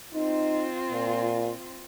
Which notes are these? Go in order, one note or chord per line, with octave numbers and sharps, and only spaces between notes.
C4 D#4 F4
A#2